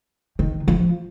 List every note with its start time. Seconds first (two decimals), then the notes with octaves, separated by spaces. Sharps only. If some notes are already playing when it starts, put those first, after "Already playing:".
0.39 D#3
0.68 F3